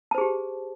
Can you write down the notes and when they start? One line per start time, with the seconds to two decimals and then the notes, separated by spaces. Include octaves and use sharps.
0.11 A5
0.15 C5
0.18 G#4
0.21 G4